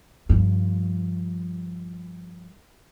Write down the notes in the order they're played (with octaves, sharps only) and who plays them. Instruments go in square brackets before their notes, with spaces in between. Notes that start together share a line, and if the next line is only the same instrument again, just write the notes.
[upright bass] G2 F3